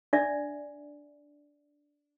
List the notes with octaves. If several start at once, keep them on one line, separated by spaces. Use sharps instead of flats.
D4 D5 E5